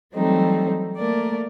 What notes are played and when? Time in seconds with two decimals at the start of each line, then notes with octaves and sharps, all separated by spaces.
0.14 E3 F#3 G3 A3 C4 D#4
0.96 A3 A#3 A#4 D5